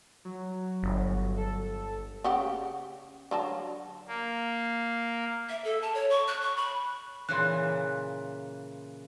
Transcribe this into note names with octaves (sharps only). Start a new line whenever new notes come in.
F#3
G1
A4
C#3 G4 F#5
D3 F#3 A5
A#3
E5
A4
A5
C#5
C#6
F#6
C#6
B5
A#2 C#3 E3 C6 F#6